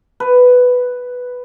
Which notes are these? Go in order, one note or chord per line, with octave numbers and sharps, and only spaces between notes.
B4